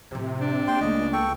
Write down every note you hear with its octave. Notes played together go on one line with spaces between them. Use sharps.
A2 C3 F3
D4
A#3 G5 C6
C#2 A3 A#3 D#5
A4 G5 C#6